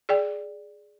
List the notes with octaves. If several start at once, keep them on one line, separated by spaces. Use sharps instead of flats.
G#4 D5 G5